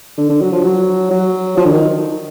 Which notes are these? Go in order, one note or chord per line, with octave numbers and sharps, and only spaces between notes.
D3
D3
F#3
F3
F#3
F#3
F3
D3
D#3